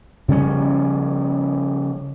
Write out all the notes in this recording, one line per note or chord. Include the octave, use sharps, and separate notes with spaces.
C#3 F3 G3 C#4